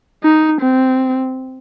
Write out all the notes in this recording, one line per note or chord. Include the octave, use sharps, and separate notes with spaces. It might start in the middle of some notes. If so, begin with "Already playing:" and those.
D#4
C4